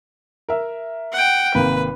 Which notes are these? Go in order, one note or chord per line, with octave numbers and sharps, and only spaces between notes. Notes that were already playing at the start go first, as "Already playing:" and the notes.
A#4 E5
F#5 G5
G#1 C3 A#3 B4